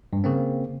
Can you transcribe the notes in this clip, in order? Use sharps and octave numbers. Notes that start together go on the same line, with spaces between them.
G2
C#3 A#3 C4